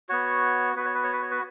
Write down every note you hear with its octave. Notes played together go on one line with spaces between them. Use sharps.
B3 F#4 C#5
B3 F#4 B4
C#5
B4
C#5
B4
C#5
B4